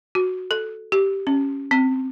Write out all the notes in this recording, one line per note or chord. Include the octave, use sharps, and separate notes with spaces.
F#4
A4
G4
C#4
C4